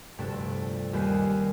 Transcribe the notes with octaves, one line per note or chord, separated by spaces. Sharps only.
F1 D2 G2 C3 D4 A4
D#2 G3 B4 G#5 D#6 C7